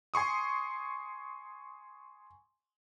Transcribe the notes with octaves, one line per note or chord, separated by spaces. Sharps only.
G#5 C6 C#6 D#6